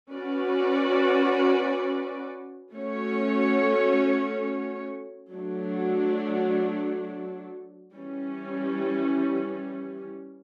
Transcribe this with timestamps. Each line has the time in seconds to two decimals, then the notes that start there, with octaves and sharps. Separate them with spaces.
0.12 C#4 F#4 B4 D5
2.72 A3 C#4 F#4 C#5
5.33 F#3 A3 D4
7.93 E3 G3 C#4